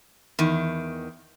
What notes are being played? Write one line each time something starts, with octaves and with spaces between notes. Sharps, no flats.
E2 D#3